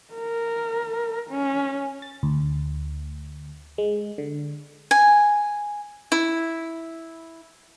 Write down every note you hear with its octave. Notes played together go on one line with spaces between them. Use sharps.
A#4
C#4
A6
D2
G#3
D3
G#5
E4